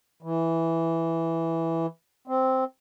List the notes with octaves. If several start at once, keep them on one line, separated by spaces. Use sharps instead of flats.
E3
C4